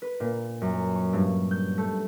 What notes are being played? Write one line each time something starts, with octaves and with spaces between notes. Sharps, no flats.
B4
A#2
F#2
C#6
G2
G6
A3